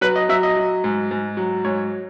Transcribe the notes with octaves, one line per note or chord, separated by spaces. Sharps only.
F#3 B4
D#5
F#3 E5
D#5
F#3
G#2
G#2
F#3
G#2 C#5